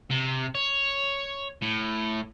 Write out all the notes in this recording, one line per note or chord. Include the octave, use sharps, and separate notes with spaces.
C3
C#5
A2